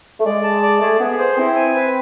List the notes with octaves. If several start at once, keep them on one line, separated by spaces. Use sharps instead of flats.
A3
G#3 D5
A5
D5
A3 G#4
B3 G#4
C5
C4 E4
G#5
B4